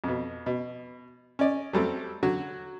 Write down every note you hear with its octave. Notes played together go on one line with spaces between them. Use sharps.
F2 B2
B2
C#4 D5 D#5
F#3 G3 A3 C4
D3 F#3 F#4